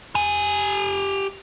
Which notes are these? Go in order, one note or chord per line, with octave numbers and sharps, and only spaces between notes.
G4 G#5